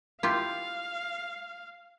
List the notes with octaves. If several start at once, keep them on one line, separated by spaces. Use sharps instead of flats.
E4 F4 G4 F5